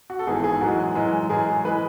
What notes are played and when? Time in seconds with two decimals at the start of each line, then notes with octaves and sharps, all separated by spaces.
0.10 F#4
0.19 A4
0.27 G#1 G#2 E3 B3 G#4
0.44 G#4
0.61 F#2 E3 G#3 F#4
0.95 F#2 E3 G#3
1.30 F#2 E3 G#3 G#4
1.65 E3 G#3 B4